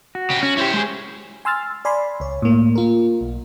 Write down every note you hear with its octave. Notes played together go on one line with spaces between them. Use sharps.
F#4
C#3 G4
C#4 F#4
C#4 E4 G4 C5
G#3 G#4
G#5 C6 E6 F6 A6
D5 G#5 B5 C6
C#2 C#5
A2 A#3
A#3 F4 A#4
B1